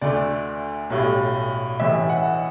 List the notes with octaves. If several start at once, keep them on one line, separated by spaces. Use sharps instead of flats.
D2 D3 A3 D5
B1 A2 G3
A1 A2 E3 G3 E5
F#5